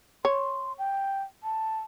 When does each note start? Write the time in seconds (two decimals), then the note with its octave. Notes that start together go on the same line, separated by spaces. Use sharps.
0.25 C#5 C6
0.78 G5
1.43 A5